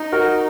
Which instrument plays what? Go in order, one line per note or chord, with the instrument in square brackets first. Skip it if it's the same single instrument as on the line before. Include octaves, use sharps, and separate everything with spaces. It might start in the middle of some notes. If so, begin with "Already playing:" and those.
Already playing: [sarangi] D#4
[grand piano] F#4 A#4